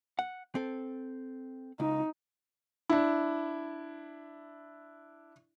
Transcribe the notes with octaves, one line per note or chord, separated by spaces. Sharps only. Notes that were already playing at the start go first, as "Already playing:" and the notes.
F#5
C4 A4
C#2 D#4
D4 E4